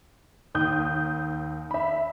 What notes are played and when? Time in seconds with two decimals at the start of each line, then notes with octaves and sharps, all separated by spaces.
0.55 D#2 D#6 G6
1.71 E5 B5